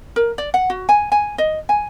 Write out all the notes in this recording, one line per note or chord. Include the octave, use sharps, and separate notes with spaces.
A#4
D5
F#5
F#4
G#5
G#5
D#5
G#5